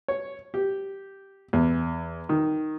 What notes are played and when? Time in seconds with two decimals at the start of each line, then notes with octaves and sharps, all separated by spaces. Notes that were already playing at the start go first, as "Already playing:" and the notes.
0.08 C#5
0.54 G4
1.53 E2
2.29 D#3